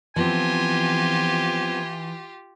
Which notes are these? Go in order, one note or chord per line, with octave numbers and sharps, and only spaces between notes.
E3 F3 B3 C4 F4 G4 G#5